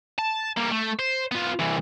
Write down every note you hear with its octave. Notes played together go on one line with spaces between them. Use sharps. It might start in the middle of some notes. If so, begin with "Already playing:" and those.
A5
G3 A#3
A3
C5
B3 F4
C2 E3